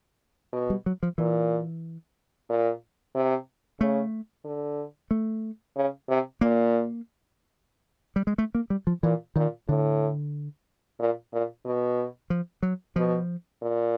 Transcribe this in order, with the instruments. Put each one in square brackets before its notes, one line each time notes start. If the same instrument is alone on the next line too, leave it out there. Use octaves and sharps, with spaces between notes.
[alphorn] B2
[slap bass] G3
F#3
F3
[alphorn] A#2 [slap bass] E3
[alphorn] A#2
C3
[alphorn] C#3 [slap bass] A3
[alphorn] D3
[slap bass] A3
[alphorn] C#3
C3
[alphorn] A#2 [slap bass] A#3
[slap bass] G3
G#3
A3
A#3
G3
F3
[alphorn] A#2 [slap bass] E3
[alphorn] A#2 [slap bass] D#3
[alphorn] A2 [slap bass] D3
[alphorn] A#2
A#2
B2
[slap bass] F3
F#3
[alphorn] B2 [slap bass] F3
[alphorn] A#2